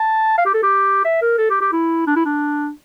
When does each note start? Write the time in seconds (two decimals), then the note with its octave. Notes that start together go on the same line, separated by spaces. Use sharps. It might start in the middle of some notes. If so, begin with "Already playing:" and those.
Already playing: A5
0.38 F5
0.46 G4
0.54 A4
0.63 G4
1.05 E5
1.22 A#4
1.38 A4
1.50 G4
1.61 G4
1.72 E4
2.07 D4
2.16 E4
2.25 D4